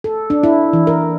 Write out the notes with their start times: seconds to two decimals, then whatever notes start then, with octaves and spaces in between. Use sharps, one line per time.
0.04 A4
0.30 D4
0.43 E4
0.73 E3
0.87 A#4